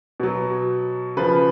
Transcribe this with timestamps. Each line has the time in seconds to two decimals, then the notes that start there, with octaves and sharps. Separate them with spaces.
0.20 B2 F#3
1.17 C#3 F3 B4